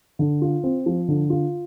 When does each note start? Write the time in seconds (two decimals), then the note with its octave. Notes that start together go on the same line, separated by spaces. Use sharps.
0.19 D3
0.42 F4
0.64 C4
0.86 F3
1.08 D3
1.30 F4